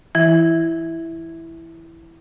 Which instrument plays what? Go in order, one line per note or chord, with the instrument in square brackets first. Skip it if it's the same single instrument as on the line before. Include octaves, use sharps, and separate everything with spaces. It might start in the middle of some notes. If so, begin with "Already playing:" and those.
[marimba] E3 E4